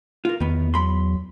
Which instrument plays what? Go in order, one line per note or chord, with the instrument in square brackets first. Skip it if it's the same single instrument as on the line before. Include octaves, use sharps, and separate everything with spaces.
[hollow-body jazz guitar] F4 A#4
[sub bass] E2 [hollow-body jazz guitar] D#3 B3
[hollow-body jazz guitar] F#3 B5 C6